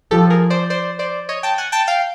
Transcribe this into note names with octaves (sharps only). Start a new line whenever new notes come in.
F3 G4 A4
G#4 A#4
C5 D5
C5 D5
C5 D5
C#5 D#5
G5 A5
F#5 G#5
G5 A5
F5 G5